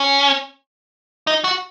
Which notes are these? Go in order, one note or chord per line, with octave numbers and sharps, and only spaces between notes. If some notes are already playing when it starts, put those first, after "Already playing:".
Already playing: C#4
D#4
F#4